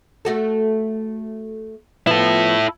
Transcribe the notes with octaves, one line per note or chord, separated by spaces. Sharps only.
A3 F#4 A4
F3 B3 E4 F4 A4